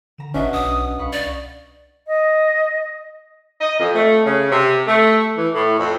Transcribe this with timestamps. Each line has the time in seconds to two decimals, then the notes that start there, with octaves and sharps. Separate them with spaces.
0.18 D3 A#5 E7
0.34 G#1 B2 C#4 D4 F#4 D#5 E5
0.53 B1 D#6
0.99 C2 F5 B5 C#6
1.13 D5
2.07 D#5
3.61 D#5
3.80 F2
3.95 A3
4.25 C#3
4.51 C3
4.87 A3
5.37 E3
5.54 A2
5.79 F2